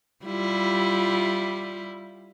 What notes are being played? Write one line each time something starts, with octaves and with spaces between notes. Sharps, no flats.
G3 E4 F4